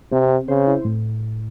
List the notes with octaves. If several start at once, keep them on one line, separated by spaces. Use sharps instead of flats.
C3 C4
C4
C#3 C5
E4
A2